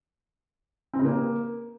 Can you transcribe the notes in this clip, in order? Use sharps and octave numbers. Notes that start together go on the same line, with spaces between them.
C4
C#3
A#3